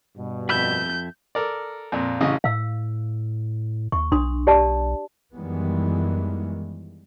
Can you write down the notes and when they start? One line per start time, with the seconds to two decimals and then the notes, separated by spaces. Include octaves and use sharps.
0.17 G2 B2
0.49 F2 E5 B5 G6
1.35 A4 A#4 D5
1.92 F2 A#2
2.21 A1 C#3 D#5
2.44 A2 F5 E6
3.92 D#2 C#6
4.12 B1 D4 C6 D#6
4.47 G4 D5 A5
5.33 F#2 D#3 E3 G3 G#3 B3